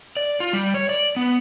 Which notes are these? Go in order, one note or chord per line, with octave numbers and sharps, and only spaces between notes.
D5
F4
G3
C#5
D5
B3